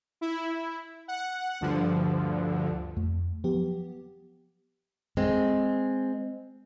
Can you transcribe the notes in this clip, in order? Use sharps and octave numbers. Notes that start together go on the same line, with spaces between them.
E4
F#5
D2 G2 D3 F3
F2 A3
F3 F#3 B3 G4
G#3 C4